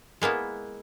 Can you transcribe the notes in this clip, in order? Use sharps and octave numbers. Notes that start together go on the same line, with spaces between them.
G#3 A#3 B3 E4